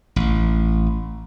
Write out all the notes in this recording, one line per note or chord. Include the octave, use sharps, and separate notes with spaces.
A1